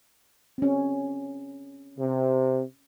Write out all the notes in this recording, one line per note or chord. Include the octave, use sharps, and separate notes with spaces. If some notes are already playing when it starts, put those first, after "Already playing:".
C4 C#4
C3